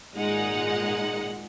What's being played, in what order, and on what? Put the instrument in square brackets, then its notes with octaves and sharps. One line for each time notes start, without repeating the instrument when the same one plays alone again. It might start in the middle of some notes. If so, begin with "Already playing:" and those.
[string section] G#1 A#2 G#3 D#4 F#5